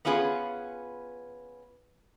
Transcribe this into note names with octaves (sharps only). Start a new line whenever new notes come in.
B3 C#4 F4 G#4 B4